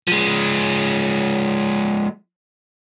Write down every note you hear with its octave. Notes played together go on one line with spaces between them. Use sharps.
F3 G#3